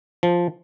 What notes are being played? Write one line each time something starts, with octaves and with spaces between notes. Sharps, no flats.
F3